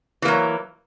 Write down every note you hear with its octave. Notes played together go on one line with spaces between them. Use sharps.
E3 F#3 A#3